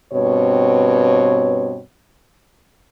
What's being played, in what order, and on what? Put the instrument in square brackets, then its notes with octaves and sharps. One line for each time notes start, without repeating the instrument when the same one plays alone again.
[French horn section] G2 B2 C4 C#5